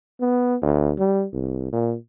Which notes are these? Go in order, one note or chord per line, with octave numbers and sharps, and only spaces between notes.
B3
D2
G3
C2
A#2